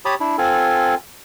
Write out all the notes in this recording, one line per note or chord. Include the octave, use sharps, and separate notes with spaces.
G4 C#5 A5 B5 D#6
D4 E4
C4 F4 A4 G#5